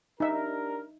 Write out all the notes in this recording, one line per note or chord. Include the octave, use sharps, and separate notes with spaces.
D4 D#4 G4 A#4 E5